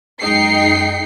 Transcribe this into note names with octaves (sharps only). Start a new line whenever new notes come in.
F#2 G#3 D#4 G5 C7 C#7